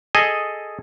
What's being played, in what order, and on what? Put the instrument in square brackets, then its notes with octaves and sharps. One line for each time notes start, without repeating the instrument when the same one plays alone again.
[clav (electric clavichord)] G#4 A4 D#5 G#5